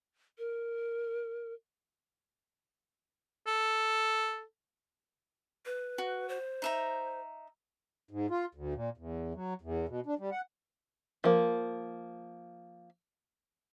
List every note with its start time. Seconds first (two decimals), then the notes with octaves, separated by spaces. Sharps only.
0.38 A#4
3.47 A4
5.66 B4
5.98 F#4
6.29 C5
6.62 D#4 E5 A#5
8.11 G#2
8.30 F4
8.55 D2
8.74 A#2
8.97 E2
9.34 F#3
9.61 E2
9.89 B2
10.06 D4
10.19 G3
10.32 F#5
11.24 F3 A#3